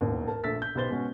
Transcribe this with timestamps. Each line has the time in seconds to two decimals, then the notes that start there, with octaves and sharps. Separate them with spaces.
0.01 E1 A1 D#2
0.28 A#4 A5
0.44 A#1 A3 E6 A6 B6
0.62 G6
0.75 B1 G4 B4 C5 A6 G7
0.90 B2 G#3 C#4 F#4